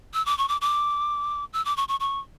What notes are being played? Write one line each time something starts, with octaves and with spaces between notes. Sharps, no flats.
E6
D6
C#6
D6
D6
E6
D6
C#6
C#6
C#6